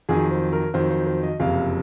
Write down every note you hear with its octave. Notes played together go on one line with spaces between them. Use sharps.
F2 D#3 F#3 G#4
C5
A#4
F2 D#3 F#3 C5
C5
C5
D#5
F#1 F2 C3 F5